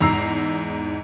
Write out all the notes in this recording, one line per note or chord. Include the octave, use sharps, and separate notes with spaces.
E2 G#2 A#5 E6 C7